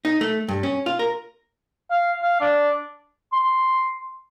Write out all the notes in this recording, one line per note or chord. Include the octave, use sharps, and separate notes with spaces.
D#4
A3
G2
C#4
F4
A#4
F5
F5
D4
C6